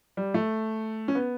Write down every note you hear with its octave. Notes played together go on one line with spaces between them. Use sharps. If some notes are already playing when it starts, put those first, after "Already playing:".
G3
A3
C#4
B3